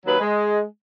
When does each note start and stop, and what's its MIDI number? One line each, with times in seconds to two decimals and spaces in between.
0.06 0.19 39
0.06 0.19 54
0.06 0.19 71
0.20 0.61 56